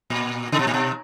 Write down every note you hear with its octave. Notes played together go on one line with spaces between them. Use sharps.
A#2
C#3
B2
A#2
B2